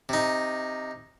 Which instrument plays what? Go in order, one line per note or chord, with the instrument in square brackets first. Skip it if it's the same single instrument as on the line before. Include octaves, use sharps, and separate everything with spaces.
[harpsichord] C3 D#4